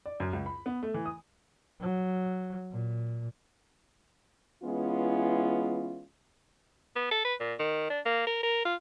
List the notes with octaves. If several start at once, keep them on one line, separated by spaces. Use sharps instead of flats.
D5
F#2
C#2
B5
B3
A3
E3
D#6
F#3
A#2
E3 G#3 B3 C#4 E4 F4
B3
A4
B4
A#2
D#3
D4
A#3
A#4
A#4
F4